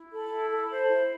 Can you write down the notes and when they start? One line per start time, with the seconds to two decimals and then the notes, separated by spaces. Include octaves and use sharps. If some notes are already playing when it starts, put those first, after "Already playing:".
Already playing: E4
0.12 A4 B5
0.31 E4
0.51 A4
0.70 C5
0.89 E4